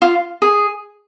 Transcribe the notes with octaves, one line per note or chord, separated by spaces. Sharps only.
F4
G#4